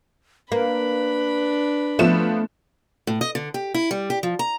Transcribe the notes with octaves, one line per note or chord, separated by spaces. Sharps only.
A#3 D4 B4 B5
F3 A3 B3 E7
A2
D#5
D3
G4
E4
G3
G4
F3
A#5